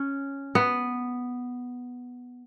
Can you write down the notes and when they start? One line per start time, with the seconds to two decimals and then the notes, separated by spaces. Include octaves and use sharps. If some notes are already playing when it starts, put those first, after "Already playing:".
Already playing: C#4
0.55 B3